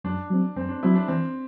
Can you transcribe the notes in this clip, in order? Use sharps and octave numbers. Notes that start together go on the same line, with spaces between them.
F#2 D4
F#3 C4
F#2 C4
D4
F#3 C4 E4
D4
E3 C4